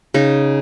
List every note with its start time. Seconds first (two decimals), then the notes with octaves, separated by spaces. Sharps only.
0.14 C#3 D#4